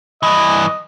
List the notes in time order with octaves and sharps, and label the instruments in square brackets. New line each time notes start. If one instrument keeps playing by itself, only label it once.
[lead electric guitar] G2 E3 [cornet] D#5